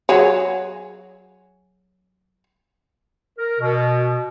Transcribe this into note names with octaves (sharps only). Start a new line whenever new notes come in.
F#3 G#4 C#5
A#4
B2